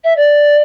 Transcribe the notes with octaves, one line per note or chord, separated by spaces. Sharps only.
E5
D5